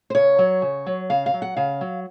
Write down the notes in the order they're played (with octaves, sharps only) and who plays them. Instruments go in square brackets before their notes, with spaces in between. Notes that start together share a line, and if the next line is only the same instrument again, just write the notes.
[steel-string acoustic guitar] C5
C#3 C#5
F#3
C#3
F#3
C#3 F5
F5
F#3
F#5
C#3 F5
F#3